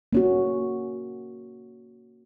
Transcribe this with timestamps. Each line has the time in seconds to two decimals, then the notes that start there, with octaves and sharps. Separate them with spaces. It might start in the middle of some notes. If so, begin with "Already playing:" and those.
0.13 A#3 C#4 F#4